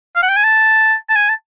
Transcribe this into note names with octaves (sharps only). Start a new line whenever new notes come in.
F5
F#5
G5
G#5
A5
A5
G#5
A5